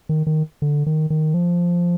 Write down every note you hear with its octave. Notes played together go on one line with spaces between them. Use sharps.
D#3
D#3
D3
D#3
D#3
F3